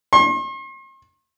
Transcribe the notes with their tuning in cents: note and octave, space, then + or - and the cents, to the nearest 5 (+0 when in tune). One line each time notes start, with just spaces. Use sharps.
C6 +45